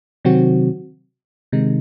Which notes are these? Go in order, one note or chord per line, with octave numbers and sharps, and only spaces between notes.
C3 D#3 F#3 C4 F#4
C3 D#3 G#3 D#4